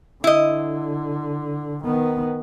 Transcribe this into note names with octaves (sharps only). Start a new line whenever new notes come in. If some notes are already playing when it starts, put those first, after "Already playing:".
D3 E4 D#5
D#3 B3